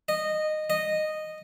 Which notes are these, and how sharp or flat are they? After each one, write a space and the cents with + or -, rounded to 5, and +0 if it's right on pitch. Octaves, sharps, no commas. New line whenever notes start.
D#5 -15
D#5 -10